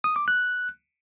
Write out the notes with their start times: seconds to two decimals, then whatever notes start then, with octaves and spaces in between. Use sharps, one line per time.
0.04 D#6
0.16 D6
0.28 F#6